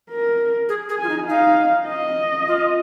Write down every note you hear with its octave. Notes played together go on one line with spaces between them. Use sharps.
A#4
G#4
G#4
G#5
F4
D#4
D#4 F5
D#5
F4